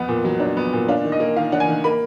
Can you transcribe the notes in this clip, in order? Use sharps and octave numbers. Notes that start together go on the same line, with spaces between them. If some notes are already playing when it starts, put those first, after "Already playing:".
Already playing: F2 B3 F#5
A#2
F#3
D4
B3
A#2
D4 F5
D#3
D#5
A#3
D#3 F5
D4 F#5
G#5
D#3
A#3 B5